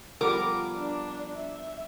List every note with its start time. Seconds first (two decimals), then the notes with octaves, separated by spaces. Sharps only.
0.21 F3 G3 B3 A#4 D6
0.76 D4
1.36 E5